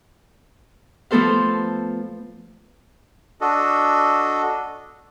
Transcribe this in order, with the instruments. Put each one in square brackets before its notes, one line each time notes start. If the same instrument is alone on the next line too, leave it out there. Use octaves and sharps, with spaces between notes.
[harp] F3 A3 B3 A4 C5 F5
[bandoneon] D4 F#4 A4 D#5